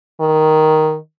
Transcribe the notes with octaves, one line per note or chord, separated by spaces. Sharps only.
D#3